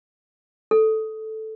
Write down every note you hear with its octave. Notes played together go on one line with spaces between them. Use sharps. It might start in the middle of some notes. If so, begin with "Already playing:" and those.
A4